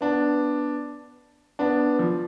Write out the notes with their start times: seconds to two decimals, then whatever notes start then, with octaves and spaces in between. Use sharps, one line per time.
0.01 B3 D4
1.59 B3 D4
1.99 F3